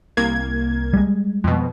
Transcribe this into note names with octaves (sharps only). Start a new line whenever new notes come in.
C2 A#3 G#6
G3 G#3
F2 B2